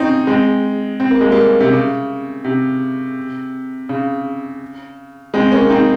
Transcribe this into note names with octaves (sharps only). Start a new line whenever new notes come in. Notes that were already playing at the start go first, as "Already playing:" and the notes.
Already playing: C4 C#4 D#4
G#3 C4
C4
A#3
G#3
G3 A#3
C3
C#3
C3
C#3
G#3 C4
A#3 C#4
C4 D#4